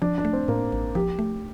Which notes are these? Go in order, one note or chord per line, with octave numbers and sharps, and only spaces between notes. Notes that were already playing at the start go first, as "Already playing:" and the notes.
F3 D4
D4
A3
C4
A2 A#3
A1
F3 G4
A3